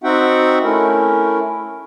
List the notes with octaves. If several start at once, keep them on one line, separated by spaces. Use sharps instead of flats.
C4 D#4 F#4 E5 F#5 G5
A3 C#4 E4 A#4